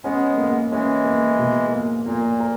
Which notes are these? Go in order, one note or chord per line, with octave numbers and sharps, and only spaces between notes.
G#3 B3 C#4
A#3
E3 G#3 C#4
A#3
B2
A#3
A#2 A#3
A#4